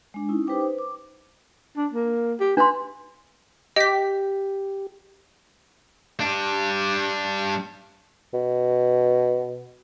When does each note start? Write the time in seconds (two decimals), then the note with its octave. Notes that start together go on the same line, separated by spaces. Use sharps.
0.14 G#3 D4
0.29 C#4 D#4 E4
0.47 D#4 G4 B4 C5 G5 D6
0.60 B4 C5
0.79 D6
1.77 D4
1.93 A#3
2.40 G4
2.57 D4 B4 C6
3.76 G4 D#5 B6
6.20 G3 D4
8.34 B2